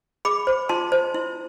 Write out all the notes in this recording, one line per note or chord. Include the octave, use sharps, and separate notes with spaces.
G#4 B5 D6
C5
F4 A5 C6
C5
E4